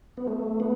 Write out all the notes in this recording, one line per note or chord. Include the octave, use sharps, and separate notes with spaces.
B3
A3
B3